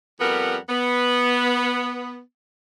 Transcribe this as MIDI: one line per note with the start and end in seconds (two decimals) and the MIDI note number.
0.20 0.57 41
0.20 0.57 55
0.20 0.57 59
0.20 0.57 70
0.20 0.57 78
0.68 2.19 59